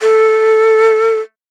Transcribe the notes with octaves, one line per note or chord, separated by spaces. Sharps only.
A4